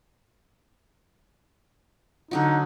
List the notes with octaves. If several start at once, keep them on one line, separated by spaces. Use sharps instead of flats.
D3 F#3 D#4 F#4